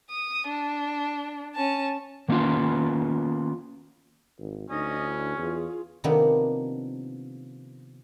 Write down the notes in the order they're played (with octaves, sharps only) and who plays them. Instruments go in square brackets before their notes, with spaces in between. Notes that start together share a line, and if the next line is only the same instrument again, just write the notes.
[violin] D#6
D4
C#4 A5
[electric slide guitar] D#3 A#3 B3 C#4 F4
[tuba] G#1
[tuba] D2 [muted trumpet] C#4 [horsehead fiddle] D#4 D#5
[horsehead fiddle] D4 E4
[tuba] E2 [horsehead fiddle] F4 G#4
[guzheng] C3 D#3 F3 A#3 B3 D4